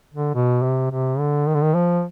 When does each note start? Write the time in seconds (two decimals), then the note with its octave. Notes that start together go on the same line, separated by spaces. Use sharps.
0.13 D3
0.35 B2
0.63 C3
0.91 C3
1.19 D3
1.47 D#3
1.55 D3
1.63 D#3
1.74 F3